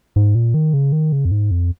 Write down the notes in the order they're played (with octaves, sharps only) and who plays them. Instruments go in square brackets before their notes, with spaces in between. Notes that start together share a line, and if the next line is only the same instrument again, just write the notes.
[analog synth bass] G#2
A#2
D#3
C#3
D#3
C#3
F2
G#2
F2